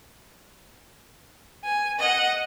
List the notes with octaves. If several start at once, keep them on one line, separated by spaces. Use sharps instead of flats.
G#5
D#5 F#5